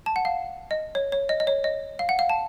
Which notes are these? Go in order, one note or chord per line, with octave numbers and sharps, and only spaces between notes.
A5
F#5
F5
D#5
C#5
C#5
D#5
D#5
C#5
D#5
F5
F#5
F5
A5